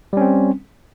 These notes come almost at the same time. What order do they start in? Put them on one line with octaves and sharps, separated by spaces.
G3 C#4 C4